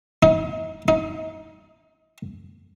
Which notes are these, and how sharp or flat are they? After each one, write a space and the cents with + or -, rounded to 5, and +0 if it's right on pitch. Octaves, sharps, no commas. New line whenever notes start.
D#4 +40
D#4 +30